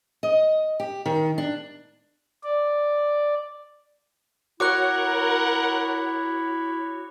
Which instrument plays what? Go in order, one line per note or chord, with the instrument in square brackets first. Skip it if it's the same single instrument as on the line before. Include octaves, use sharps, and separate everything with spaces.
[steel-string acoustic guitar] D#5
G4
D#3
D4
[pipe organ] D5
[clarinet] E4 [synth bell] F#4 C#5 [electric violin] A#4 F#5 [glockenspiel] D6 F#6